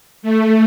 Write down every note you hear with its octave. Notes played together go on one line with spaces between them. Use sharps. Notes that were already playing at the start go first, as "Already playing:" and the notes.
A3